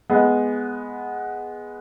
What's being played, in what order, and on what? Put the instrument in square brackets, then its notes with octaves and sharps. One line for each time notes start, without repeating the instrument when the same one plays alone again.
[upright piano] G#3 B3